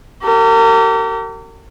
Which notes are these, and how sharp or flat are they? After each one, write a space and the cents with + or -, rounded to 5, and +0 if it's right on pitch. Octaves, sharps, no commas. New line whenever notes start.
G4 -40 A#4 -40